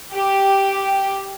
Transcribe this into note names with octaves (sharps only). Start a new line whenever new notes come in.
G4